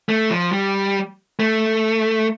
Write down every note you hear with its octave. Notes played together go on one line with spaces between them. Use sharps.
A3
F3
G3
A3